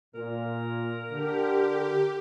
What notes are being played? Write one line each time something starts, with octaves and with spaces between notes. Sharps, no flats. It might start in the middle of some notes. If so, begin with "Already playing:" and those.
A#2 A#4
D3 G4